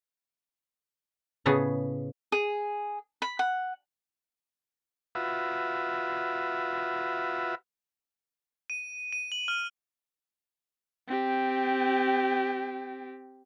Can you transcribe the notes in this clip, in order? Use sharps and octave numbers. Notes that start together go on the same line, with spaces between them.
A2 C#3 B3 G#4
G#4
B5
F#5
F4 F#4 B4 E5
D#7
D#7
F#7
F6
C4 G4